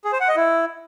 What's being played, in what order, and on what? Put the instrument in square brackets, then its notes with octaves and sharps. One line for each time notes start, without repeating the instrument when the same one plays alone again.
[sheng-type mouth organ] G#4
C5
F#5
D#5
E4